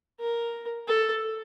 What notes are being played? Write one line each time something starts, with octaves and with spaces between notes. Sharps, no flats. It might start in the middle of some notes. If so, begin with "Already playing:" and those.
A#4
A4